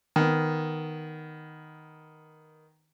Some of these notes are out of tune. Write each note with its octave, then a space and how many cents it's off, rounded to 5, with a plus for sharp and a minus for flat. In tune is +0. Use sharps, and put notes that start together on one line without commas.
D#3 +0 B3 +0